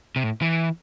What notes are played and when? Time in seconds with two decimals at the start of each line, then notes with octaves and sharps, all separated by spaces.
0.16 C3
0.24 A2
0.42 E3